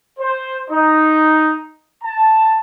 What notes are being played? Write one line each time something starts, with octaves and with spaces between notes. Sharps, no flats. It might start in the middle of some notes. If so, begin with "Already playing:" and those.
C5
D#4
A5